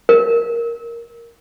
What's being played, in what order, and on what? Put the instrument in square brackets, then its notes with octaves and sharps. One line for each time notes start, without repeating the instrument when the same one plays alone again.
[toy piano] A#4